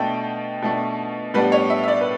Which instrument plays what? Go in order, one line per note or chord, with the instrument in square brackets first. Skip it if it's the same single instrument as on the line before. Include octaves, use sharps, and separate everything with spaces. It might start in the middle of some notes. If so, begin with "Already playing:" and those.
Already playing: [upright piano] B2 A3 D4 G5
B2 A3 D4
A2 G3 B3 D4 B4
C#5
E5
E5
D5
B4